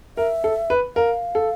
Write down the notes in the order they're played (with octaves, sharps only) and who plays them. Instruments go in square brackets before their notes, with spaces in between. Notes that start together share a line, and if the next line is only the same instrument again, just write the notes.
[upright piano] A#4 [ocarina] E5
[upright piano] A4
B4
[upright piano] A#4 [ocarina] F5
[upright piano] A4